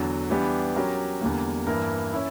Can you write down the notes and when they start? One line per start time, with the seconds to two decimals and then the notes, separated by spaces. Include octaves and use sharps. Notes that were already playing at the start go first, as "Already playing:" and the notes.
Already playing: E2 D3 F#3
0.29 E3 G3 B3 D4 G4
0.76 F#3 C#4 G4 A#4
1.21 E2 D3 G3 A#3
1.67 G2 E3 A#3 E4 A#4
2.13 C#4 E4